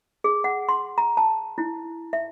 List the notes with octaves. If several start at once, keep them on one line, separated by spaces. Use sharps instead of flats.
G#4
F#5
C6
A#5
A5
E4
E5